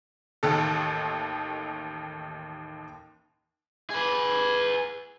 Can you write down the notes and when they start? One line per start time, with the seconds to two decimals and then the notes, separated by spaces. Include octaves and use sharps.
0.43 A1 D#2 D#3 A4
3.90 G#4 B4